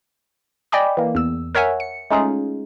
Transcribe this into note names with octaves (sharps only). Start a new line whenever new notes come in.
D5 D#5 G5 G#5 B5 D6
E3 A#3
E2 E6
A#4 C#5 E5 F#5 G#5
C#7
G#3 A3 C#4 D#4 F4 G#4